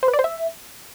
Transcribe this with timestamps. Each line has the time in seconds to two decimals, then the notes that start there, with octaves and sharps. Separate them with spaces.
0.03 C5
0.08 B4
0.13 D5
0.19 C5
0.24 E5